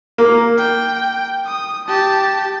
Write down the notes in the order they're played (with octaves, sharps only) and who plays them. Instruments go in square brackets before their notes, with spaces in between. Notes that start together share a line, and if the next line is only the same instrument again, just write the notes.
[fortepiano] A#3
[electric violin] G5
D#6
G4 A5